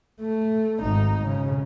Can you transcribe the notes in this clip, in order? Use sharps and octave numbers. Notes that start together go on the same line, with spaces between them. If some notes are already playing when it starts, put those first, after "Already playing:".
A3
G#1 D#4
C#3